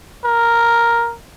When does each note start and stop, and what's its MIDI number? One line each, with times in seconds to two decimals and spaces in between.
0.25 1.15 70